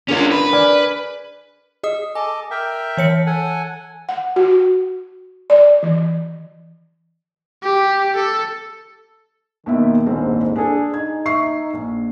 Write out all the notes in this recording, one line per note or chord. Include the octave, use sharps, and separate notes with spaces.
C#4 D4 F4 G#4 A#4
B4
D5 G#5 F6
G#4 D#5 D#6
A4 D#5 G#5 D6
A#4 E5 G5
E3 C#5 C#7
A4 F#5 G#5
F#5
F#4
D5
E3
G4
A4
D#2 B2 D#3 E5
D#1 A#1 G#2 C4
D4 G#4 A4
D#4 G#6
E5 C#6 C7
A#1